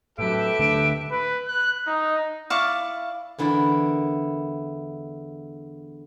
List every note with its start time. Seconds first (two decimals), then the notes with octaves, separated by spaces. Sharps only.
0.19 A2 F#3 G4 A4 B4 E5 D7
0.59 D1 D3 A3
1.11 B4
1.48 F#6
1.87 D#4
2.50 E4 D5 F5 C#6
3.38 E2 D3 E4 A#4 D5